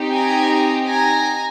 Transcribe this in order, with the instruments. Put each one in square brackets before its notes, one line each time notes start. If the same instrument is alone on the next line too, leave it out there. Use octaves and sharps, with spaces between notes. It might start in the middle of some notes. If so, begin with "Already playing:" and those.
Already playing: [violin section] C4 D#4 G4
G#5 A#5
G#5 A#5